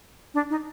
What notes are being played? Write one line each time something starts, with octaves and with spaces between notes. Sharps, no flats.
D4
D#4